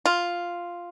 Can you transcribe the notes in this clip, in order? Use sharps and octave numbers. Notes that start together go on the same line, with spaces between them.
F4